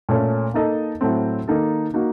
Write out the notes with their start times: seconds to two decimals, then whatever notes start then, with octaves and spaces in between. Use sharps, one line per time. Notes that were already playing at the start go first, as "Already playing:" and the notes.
0.09 A#2 A3 C#4
0.54 A#3 D#4 A4 D#5
1.01 A2 F#3 A3 C4
1.48 D#3 A#3 D#4 A4
1.94 A#3 D#4 F#4